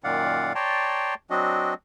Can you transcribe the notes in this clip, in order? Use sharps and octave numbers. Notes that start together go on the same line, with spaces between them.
F#2 A#2 D#3 D5 F5 F#5
C#5 D5 G5 A5 A#5 C6
F#3 C4 D4 F#4 D#5